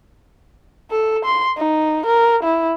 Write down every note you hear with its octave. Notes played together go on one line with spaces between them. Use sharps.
A4
C6
D#4
A#4
E4